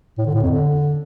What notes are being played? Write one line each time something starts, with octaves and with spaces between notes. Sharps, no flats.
A2
D3
A2
F2
D3